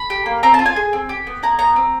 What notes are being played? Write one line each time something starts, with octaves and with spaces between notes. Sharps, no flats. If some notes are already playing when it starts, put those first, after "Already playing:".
Already playing: B5
G4
A#3
C4 A#5
F4 A5
G#5
G#4
C4
G4
B3
E4 A#5
B3 A#5
C4